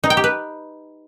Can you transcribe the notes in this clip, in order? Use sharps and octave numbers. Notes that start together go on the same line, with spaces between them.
D#4
G5
G4
B4